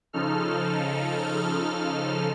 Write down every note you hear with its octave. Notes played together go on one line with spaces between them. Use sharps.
C#3 F3 D#4 A4 F6